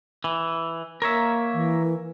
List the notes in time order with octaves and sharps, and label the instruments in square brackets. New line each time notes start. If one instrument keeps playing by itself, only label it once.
[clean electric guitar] E3
[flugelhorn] A#3 [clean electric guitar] A#4 C#5 E5
[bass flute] E3